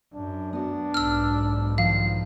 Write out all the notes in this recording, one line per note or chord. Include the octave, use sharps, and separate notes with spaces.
F#2 D4
B3 D4 F#4
B1 G#2 E6 F6
D#3 F3 F5